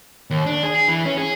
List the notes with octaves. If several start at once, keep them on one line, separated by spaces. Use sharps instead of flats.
D#2
D4
G#4
G#4
E3
C#4
G#4